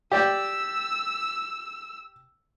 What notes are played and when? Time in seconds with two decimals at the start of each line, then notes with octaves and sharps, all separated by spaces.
0.12 G4 D5 G5 E6